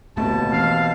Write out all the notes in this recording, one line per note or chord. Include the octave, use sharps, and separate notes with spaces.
D1 D#2 B2 A3 C4 A5
E3 C4 F5